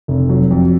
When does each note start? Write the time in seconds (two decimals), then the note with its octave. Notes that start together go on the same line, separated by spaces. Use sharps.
0.08 F1
0.29 F#3
0.51 F2